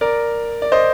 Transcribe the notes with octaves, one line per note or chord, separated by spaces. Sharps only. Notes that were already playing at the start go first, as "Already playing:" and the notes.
A#4 D5
D5
C5 D#5